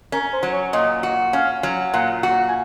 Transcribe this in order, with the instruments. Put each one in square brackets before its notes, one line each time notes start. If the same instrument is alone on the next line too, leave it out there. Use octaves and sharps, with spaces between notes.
[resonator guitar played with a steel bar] C#4 [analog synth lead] A#4
[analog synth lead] C5
[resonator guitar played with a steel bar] F#3
[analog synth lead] C#5
[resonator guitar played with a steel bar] A#2 [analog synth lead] D#5
[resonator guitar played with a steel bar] F#4
[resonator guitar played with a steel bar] C#4 [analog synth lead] F5
[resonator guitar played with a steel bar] F#3
[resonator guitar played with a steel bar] A#2 [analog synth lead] F#5
[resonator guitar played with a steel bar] F#4
[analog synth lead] G#5